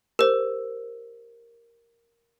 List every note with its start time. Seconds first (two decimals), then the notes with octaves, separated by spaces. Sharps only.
0.19 G4 A#4 C5